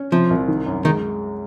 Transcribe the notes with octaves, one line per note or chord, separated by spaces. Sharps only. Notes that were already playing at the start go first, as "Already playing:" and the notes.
Already playing: C#4
C3 F3
C2
D#3
F#2
D#3 G#3